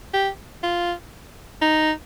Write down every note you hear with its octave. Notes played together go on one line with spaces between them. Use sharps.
G4
F4
D#4